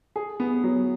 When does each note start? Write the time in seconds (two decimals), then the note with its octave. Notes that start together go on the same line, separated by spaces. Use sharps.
0.16 G#4
0.40 B3
0.64 F#3